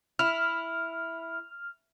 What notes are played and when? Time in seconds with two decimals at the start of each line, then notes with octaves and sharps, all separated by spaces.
0.19 E4 F6